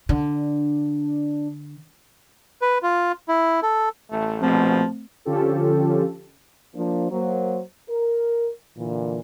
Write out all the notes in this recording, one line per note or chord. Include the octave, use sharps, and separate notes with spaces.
D3 D4
B4
F4
E4
A4
A1 A3
A#1 B2 F3 A3 C4
D3 F3 C#4 F4 G4 A4
F3 A#3 D4
F#3 A#3 C5
A#4
A#2 D3 E3